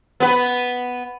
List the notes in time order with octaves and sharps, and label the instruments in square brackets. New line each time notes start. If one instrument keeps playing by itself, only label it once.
[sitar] B3 B4